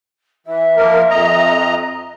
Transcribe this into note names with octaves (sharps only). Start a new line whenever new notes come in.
E3 E5
F3 A#3 A#4
F2 D#5 A#5